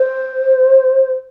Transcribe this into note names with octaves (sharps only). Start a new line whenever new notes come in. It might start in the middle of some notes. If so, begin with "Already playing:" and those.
Already playing: C5